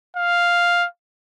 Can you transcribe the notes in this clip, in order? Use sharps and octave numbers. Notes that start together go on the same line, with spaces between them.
F5